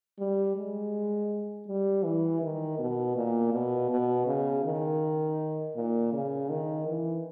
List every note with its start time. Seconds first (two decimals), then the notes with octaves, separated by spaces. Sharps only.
0.19 G3
0.56 G#3
1.67 G3
2.04 E3
2.42 D#3
2.79 B2
3.16 A#2
3.53 B2
3.90 B2
4.27 C#3
4.64 D#3
5.76 A#2
6.13 C#3
6.49 D#3
6.87 E3